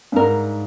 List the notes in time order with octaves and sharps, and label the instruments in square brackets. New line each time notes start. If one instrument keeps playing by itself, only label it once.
[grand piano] G2
[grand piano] G#2 [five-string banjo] A#4